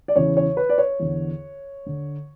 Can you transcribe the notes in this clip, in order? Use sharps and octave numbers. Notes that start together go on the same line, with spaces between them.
D5
E2 C#3 E3 C#5
C#5
B4
D5
C#5
E2 D3
D3